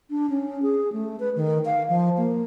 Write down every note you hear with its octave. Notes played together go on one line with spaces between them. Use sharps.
D4
C#4
G#4
A3
B4
D#3
F5
F3
A#3